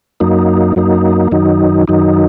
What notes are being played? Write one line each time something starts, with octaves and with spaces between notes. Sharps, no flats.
F#2 F#3 A#3 D#4
F#2 F#3 A#3 D#4
F#2 D#3 F#3 D#4
F#2 D#3 F#3 D#4